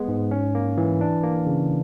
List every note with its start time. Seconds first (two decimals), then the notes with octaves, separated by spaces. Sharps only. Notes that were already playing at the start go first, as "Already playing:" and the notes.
Already playing: G#3 B3
0.08 G#2
0.31 C#4
0.55 A#3
0.77 E3
1.01 D4
1.24 A#3
1.46 C#3